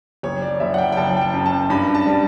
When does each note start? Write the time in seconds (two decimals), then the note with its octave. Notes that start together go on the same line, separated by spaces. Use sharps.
0.23 F#1 C#5
0.42 D5
0.60 F#1 E5
0.74 F#5
0.78 G5
0.92 G5
0.97 F#1 A5
1.17 G5
1.21 A5
1.34 F#2
1.46 A5
1.70 G2 B5
1.95 A5
2.07 G3